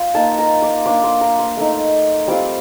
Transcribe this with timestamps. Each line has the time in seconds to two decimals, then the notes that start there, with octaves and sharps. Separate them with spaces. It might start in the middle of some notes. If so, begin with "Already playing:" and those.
Already playing: F4 C6
0.15 A#3 D#4 A5
0.39 A#5
0.62 D6
0.86 A#3 D4 F4 D6
1.04 C6
1.21 A#5
1.39 C6
1.57 A3 D#4
2.28 G3 C4 F4 D6